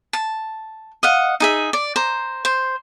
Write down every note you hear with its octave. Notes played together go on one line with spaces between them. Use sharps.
A5
D#5 F5 F#5
D#4 G#4 E5
D5
C5 A#5
C5